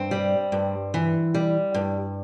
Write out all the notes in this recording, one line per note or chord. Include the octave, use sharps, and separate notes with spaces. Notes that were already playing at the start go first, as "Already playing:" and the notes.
Already playing: G2 C4
G3
G2
E3
G3
G2